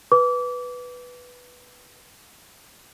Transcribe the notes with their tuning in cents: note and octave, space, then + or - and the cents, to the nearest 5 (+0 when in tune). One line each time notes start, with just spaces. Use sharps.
B4 +0 D6 -25